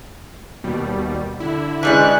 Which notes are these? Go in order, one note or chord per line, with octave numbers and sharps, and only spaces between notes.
D#2 B2 G3
D3 E4
E3 G3 G#3 C#4 F#6